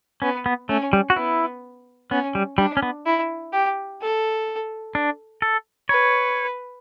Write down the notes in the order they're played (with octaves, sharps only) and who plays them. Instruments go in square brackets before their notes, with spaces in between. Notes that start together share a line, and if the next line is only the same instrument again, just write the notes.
[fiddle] B3 [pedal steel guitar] C#4
[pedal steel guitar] B3
[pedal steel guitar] A3 [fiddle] C#4
[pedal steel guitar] G3
F#4
[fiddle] B3 [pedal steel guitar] E4
[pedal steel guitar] B3 [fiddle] C#4
[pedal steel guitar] G3
[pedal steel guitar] G3 [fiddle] D4
[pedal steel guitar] C#4
B3
[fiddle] E4
G4
A4
[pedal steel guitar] D4
A4
[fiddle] B4 [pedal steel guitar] C#5